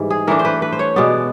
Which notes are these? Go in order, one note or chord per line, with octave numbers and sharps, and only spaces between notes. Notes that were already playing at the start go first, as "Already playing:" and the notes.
Already playing: G#2 E3 G3
G#4
E3 A3 D4 A#4
C5
B4
B4
C5
C#5
B2 G#3 B3 D5